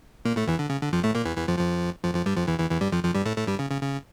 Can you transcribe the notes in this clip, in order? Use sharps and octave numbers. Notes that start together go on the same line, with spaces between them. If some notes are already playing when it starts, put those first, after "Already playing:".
A#2 A#3
A2 A3
E2 E3
D3
C#3
D3
F2 F3
A2 A3
A#2 A#3
E2 E3
E2 E3
F2 F3
F2 F3
F2 F3
F2 F3
G2 G3
F2 F3
E2 E3
E2 E3
E2 E3
G2 G3
F2 F3
F2 F3
G2 G3
A2 A3
A2 A3
G2 G3
C#3
C#3
C#3